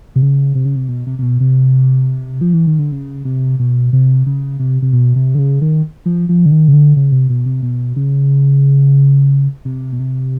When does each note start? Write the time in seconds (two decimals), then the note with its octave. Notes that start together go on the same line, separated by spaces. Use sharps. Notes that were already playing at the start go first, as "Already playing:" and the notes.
0.16 C3
0.22 C#3
0.55 C3
0.65 C#3
0.76 C3
0.89 B2
1.07 C3
1.19 C3
1.22 B2
1.40 C3
2.41 F3
2.54 E3
2.67 D#3
2.79 D3
2.92 C#3
3.25 C3
3.59 B2
3.93 C3
4.26 C#3
4.59 C3
4.82 C3
4.93 B2
5.16 C3
5.35 D3
5.39 C#3
5.61 D#3
6.06 F3
6.29 F3
6.46 D3
6.51 D#3
6.68 C#3
6.73 D3
6.96 C#3
7.12 C3
7.30 B2
7.46 C3
7.63 B2
7.96 C#3
9.65 C3
9.93 B2
10.00 C3